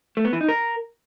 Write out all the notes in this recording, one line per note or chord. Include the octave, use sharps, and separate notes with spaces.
A3
B3
E3
D#4
A#4